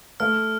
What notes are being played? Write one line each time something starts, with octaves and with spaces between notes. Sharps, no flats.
A3 F6